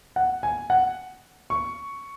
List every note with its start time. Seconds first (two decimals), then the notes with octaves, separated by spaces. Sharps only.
0.16 F#5
0.43 G#5
0.70 F#5
1.50 C#6